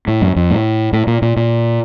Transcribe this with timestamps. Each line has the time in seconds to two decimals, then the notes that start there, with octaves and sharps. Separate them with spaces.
0.08 A2
0.22 F#2
0.36 F2
0.51 A2
0.93 A2
1.07 A#2
1.22 A#2
1.37 A#2